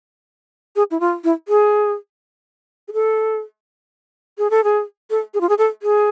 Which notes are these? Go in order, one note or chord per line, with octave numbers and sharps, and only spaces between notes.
G#4
E4
F4
E4
G#4
G#4
A4
G#4
A4
G#4
A4
G#4
F4
G#4
A4
G#4